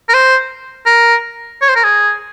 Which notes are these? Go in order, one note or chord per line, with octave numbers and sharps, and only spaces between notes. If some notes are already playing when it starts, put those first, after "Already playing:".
A#4
C5
A#4
C#5
C5
A#4
G#4